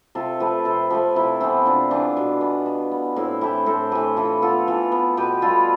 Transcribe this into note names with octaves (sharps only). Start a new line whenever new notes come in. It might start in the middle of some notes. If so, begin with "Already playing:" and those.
C3 F4 A4
F3 A3 G4 B4
C3 A4 C5
F3 A3 G4 B4
C3 E4 G4
E3 B3 C4 E4
C3 D4 F4
E3 B3 D4 F4
B2
B3
B2
B3
A2 C4 E4
E3 A3 E4 G4
A2 A4 C5
E3 A3 G4 B4
E3 F4 A4
B3 F4 A4
E3 F4 A4
B3
B2 G4 B4
G3 B3 F4 A4